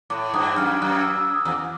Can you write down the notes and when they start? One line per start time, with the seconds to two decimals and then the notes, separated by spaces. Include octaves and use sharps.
0.10 A2 D6
0.33 G2 D#6
0.57 F#2 F6
0.82 F#2 F#6
0.99 E6
1.18 E6
1.34 D#6
1.45 E2
1.53 D6